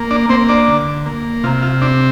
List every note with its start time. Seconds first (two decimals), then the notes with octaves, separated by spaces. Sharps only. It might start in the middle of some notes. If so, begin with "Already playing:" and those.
Already playing: A#3
0.11 D4 D5
0.29 A#3 C4 C5
0.49 D4 D5
0.68 D3
1.06 A#3
1.44 C3 F4
1.63 F4
1.82 C4 D4